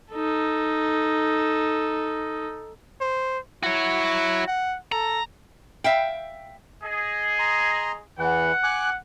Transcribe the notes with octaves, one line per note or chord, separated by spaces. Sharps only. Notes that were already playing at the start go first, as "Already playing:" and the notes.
D#4 A4
C5
E4 F#4 C#5
F#5
A4 A#5
E5 F5 G5
G#4 D#5
A#5 C6
E2 E3 F#5
G#5 D6 F#6